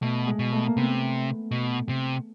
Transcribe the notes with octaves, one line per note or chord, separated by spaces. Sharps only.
B2 A3
G#3
B2
A3
A#3
C3 B3
B2
C3